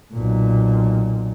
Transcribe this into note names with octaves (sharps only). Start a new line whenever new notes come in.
B1 A#2